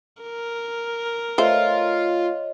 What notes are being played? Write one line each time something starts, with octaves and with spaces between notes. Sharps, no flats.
A#4
A3 F4 C5 C#5 D#5